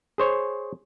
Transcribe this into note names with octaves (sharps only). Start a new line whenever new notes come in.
G#4 C5 C#5